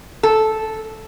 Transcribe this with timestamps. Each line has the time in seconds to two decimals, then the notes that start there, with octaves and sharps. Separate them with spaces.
0.23 A4